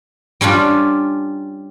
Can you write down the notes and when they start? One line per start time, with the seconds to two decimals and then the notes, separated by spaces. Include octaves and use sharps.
0.41 G3 C#4 D4 F4